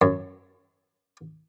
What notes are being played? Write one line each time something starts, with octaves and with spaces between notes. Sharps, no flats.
F#2